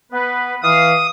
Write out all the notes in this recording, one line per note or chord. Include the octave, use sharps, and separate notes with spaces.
B3 B4
E3 F5 D#6